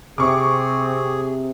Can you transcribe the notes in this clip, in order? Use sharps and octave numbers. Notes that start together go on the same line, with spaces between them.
C3 C4 G#4 C#6 D6